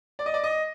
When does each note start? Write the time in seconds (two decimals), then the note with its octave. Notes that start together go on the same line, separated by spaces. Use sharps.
0.19 D5
0.26 D#5
0.34 D5
0.44 D#5